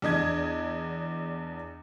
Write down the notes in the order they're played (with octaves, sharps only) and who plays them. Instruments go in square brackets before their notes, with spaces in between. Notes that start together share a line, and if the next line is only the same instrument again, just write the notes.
[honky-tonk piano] E2 D4 D#5 G#6